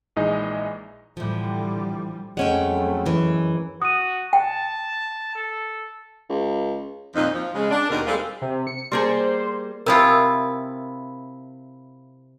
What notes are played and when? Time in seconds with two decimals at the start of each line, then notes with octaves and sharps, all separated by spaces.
0.16 A#1 E3 G#3 D#4 D#5
1.17 A2 D3 E3 F3 G3
2.37 F2 F#3 G#3 A3 C#4 F#5 G5
3.06 F#2 E3
3.82 F#4 D#6 D#7
4.33 G5 A5
5.35 A4
6.29 C#2
7.15 F2 A#2 D#3 F3 D#4
7.33 F3
7.55 C#3 G#3
7.70 D4
7.89 D#2 B2 D#3 A#4
8.06 G3 G#3 C4 F4 G#4 A4
8.42 C3
8.67 C#7
8.92 G3 A#3 G#4 C5
9.86 C3 E4 F4 A#4 G#5 D#6